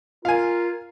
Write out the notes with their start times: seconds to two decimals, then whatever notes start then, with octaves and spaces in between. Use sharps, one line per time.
0.25 F4 A#4 F5 G#5